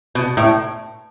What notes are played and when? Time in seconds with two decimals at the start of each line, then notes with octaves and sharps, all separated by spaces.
0.15 B2
0.37 A2